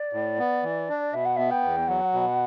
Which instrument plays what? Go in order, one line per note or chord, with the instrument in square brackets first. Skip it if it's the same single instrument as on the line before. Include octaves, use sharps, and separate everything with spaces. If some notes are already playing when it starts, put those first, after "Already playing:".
Already playing: [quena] D5
[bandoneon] A2
B3
E3
D4
[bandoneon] B2 [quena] E5
[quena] F#5
[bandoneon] B3 [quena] E5
[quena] G5
[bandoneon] E2
[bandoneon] F#3 [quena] F#5
[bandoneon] B2